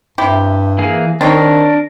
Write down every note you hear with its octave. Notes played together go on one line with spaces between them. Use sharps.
G2 C3 E4 G4
E3 A#3 G#4
D#3 C4 D4 D#4 A#4 C#5